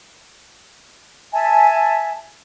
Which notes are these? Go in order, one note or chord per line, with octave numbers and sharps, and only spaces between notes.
E5 G#5 A5